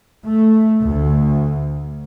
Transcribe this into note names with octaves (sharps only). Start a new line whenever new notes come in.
A3
D2